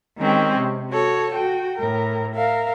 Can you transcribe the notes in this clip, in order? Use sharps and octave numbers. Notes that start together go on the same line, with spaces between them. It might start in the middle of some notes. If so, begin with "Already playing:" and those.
D#3 G#3 C4 C#4 G4
C3
F#4 A4 C#5
F#4 G5
A2 A#4
A#4 E5 F5